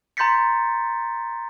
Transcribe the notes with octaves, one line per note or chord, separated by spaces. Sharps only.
A#5 C6 G6 A6 B6 C#7